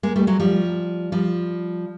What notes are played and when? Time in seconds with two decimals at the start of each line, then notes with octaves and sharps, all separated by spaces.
0.03 G#3 A#3
0.16 G3 A3
0.27 F#3 G#3
0.40 F3 G3
1.12 F3 G3